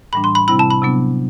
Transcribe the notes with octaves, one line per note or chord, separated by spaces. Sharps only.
A2 E3 G3 D4 B5
C6
B5
C3 G3 C4 E4 B5
A5
B5
C3 F#3 B3 D4